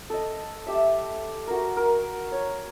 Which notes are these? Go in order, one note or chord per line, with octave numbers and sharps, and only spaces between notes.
A4 D#5
G4 E5
F#4 A#4
A#4
C#5